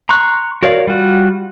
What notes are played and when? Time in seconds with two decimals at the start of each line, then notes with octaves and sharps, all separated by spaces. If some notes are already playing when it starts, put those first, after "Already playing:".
0.09 A#5 C6 C#6 F#6
0.63 F#4 A#4 C#5 D5 F5
0.87 G3 F4 F#4